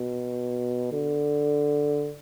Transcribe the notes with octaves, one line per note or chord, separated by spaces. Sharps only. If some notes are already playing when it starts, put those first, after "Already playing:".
Already playing: B2
D3